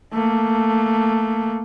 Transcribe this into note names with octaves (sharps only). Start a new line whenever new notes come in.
A3 A#3